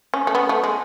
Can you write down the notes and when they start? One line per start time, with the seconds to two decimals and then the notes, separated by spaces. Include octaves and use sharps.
0.14 C#4
0.27 A3
0.35 B3
0.49 A3
0.64 G#3